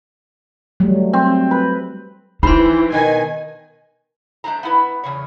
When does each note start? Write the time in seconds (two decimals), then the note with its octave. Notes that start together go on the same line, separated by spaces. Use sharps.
0.80 F#3 G3 A3
1.13 C4
1.51 B4
2.43 E3 D#4 C5 G5 B5 C6
2.92 B2 D#3 G#5
4.44 G#3 A3 D4 C5 A#5
4.63 B3 E4 B4
5.03 E2 C#3 C#5